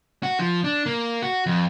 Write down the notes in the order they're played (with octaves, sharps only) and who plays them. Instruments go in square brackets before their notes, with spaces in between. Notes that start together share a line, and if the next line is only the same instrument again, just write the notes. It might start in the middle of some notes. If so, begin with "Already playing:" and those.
[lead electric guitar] F#4
F3
D4
A#3
F#4
F2